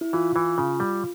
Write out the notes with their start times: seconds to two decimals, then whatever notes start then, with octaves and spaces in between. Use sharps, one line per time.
0.01 E4
0.13 E3 F4
0.36 E3
0.58 C#3
0.80 G3